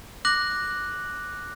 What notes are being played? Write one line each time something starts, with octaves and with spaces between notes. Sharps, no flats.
D6 F#6 A#6 F#7